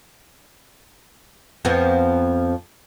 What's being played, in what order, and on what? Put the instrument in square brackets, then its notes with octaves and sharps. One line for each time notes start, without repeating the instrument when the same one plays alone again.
[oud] F2 F3 B3